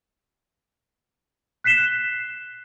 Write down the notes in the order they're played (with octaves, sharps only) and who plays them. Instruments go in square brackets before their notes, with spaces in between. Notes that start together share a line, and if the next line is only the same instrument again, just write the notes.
[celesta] F#6 B6 C7 E7 G7